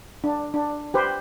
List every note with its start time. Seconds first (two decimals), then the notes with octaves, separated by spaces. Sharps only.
0.24 D4
0.54 D4
0.94 G4 B4 C5